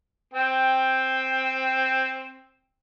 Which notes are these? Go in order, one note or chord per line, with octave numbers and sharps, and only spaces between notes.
C4 G5